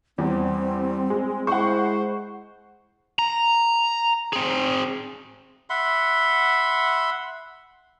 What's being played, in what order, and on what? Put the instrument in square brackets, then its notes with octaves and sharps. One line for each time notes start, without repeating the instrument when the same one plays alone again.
[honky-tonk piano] E2 [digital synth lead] G3 [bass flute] C4
[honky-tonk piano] G#3
[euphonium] G#3 [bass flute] E4 [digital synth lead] C5 [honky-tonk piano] F#5 C#6
[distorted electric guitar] A#5
C4 G#4
[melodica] E5 F#5 B5 C6